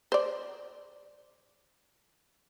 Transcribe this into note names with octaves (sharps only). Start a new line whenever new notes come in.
C5 D5